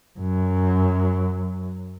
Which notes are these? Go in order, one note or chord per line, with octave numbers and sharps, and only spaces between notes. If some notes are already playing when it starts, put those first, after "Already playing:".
F#2 F#3